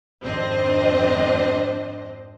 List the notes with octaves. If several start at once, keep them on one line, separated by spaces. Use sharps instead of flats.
G#1 F2 C4 D4 C5 D#5